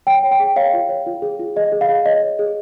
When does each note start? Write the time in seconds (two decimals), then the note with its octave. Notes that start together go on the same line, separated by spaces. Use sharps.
0.07 C#5 G5
0.24 C#5
0.31 G5
0.40 G#4
0.56 C#5 F5
0.73 F4
0.89 C#5
1.06 F4
1.22 G#4
1.39 F4
1.56 G#4 D#5
1.72 G#4
1.81 F5
1.89 G#4
2.06 C#5 D#5
2.22 C#5
2.39 G#4